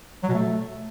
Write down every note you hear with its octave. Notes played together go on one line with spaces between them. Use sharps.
F#3
B2
A3